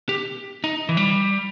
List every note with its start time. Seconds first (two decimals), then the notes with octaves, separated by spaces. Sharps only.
0.09 G4
0.64 D#4
0.89 E3
0.97 G3